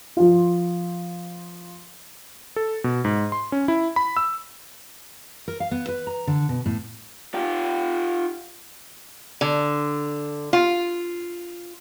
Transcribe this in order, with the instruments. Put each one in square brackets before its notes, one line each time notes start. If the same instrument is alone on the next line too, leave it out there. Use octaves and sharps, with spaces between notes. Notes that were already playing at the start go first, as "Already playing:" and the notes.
[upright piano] F3 F4
[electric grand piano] A4
B2
G#2
C6
C#4
E4
B5
E6
[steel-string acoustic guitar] A#4
F5
B3
B4
A#5
D3
B2
A2
[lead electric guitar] F4 G4
[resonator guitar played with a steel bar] D3
F4